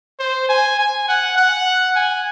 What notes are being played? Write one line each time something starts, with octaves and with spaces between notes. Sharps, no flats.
C5
G#5
G#5
F#5
F#5
G#5